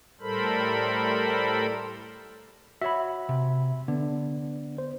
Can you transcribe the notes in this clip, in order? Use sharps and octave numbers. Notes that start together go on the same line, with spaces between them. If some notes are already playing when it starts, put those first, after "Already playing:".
A2 G3 A4 A#4 C5 B5
F#4 C#5 E5 B5
C3
D3 B3 D4
C5